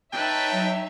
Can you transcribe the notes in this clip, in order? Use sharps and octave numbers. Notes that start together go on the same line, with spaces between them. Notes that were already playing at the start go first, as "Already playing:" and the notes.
D#4 B4 C#5 E5 G5 A5
F#3